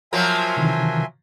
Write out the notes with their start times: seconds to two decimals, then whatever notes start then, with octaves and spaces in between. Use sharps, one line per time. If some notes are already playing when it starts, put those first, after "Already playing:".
0.13 F3 F#3 A#3 E5 G#5 C6
0.57 C3 D#3 E3